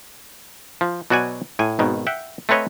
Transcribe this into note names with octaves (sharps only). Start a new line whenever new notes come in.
F3
B2 F#3 F#4 D5 F#5 G#5
A2 G#5
G#1 B2 D#3
E5 F#5 G5
A3 C4 B4 C#5 D#5